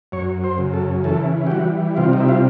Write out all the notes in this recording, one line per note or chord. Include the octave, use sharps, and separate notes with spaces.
F#2 C#5
C5
C#3
A4
E3 A4
G4
G3 F#4
C3 F4
D#4
E4
F4